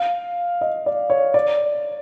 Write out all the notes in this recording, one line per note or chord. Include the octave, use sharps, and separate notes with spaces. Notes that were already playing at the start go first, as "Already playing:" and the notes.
Already playing: F5
D#5
D5
C#5
D5